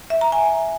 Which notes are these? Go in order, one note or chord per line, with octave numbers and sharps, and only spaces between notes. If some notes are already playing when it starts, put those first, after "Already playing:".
E5
A#5
G#5